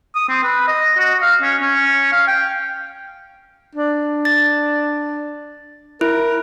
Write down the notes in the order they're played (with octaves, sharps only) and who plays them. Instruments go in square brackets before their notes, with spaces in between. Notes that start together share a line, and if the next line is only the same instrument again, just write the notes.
[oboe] D#6
C4
B4
D#5
F#4
F5
C#4
C#4
F5
G5
[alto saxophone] D4
[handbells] A6
[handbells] E4 [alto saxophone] A#4